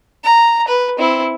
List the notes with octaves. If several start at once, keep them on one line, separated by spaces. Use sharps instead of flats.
A#5
B4
C4 E4